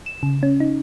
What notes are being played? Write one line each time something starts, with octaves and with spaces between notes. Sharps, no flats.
E7
C#3
C#4
D#4